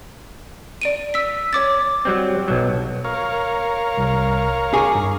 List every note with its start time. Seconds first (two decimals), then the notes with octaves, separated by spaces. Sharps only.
0.82 D5 D7 D#7
1.14 E6 B6
1.53 C#5 D6 A6
2.05 F#3 G3 C4
2.48 B1 F#3
3.05 A#4 C#5 F5
3.98 C2
4.74 G#4 C#6 D6
4.95 G2